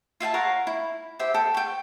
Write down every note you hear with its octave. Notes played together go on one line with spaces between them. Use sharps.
F4 E5 G5 A5
A#4 C#5 F5 F#5
E4
G4 C5 E5 G5
A4 G5 D#6
G5 C#6